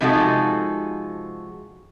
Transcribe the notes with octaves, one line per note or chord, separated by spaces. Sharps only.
C3 F3 G#3 D#4 F#4 A4